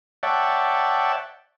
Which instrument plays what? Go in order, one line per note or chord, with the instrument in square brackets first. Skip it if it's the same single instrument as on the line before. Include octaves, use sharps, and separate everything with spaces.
[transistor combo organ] C#5 D5 E5 F#5 G5 A5